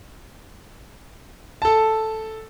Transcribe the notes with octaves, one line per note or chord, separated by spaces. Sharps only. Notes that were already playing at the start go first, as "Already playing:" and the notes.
A4 A5